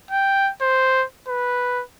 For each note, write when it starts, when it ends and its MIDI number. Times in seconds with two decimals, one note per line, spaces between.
0.11 0.51 79
0.61 1.05 72
1.28 1.83 71